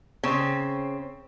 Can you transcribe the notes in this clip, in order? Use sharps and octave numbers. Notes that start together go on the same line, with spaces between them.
C#3 C4